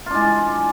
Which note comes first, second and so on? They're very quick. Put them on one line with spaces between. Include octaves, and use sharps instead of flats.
F4 D4 G#3